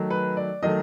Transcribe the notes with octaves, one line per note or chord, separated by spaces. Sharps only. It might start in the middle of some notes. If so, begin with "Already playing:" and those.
Already playing: D#3 F#3 A3
B4
D5
D#3 F#3 A3 D#5